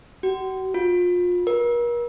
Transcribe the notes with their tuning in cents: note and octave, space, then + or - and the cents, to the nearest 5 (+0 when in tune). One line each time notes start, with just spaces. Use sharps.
F#4 +40
F4 +30
A#4 +40